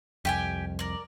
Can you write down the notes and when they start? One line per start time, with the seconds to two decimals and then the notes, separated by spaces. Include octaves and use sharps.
0.25 C2 F2 G4 G5 G#5
0.79 A#4 D5